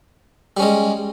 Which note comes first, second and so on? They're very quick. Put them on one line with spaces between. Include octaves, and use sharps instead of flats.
G3 C#4 G#3